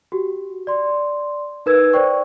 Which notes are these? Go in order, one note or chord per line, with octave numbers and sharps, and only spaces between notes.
F#4 G4
D5 C6
D#4 A#4 B4 E6 G#6
A#4 C5 D5 G5 C#6